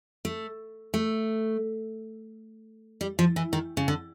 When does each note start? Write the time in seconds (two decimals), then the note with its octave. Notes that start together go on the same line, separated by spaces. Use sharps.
0.25 A3
0.94 A3
3.01 G3
3.19 F3
3.36 E3
3.53 D#3
3.77 C#3
3.88 D3